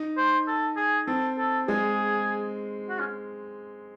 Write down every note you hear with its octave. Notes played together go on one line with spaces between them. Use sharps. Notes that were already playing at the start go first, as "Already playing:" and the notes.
Already playing: D#4
C5
A4
G#4
C4 A4
A4
G#3 G#4
F#4
C#4